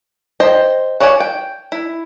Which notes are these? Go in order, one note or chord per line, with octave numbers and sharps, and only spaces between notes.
C5 D#5 G5
F#4 C#5 D5 F#5 G#5
G5
E4